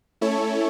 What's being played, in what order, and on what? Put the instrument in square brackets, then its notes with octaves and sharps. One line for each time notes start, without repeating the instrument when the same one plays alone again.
[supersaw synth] A3 C#4 E4 A4 C#5